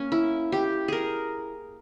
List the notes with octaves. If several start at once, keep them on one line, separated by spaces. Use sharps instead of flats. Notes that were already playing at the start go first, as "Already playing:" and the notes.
Already playing: A#3 C#4
E4
G4
G#4 A#4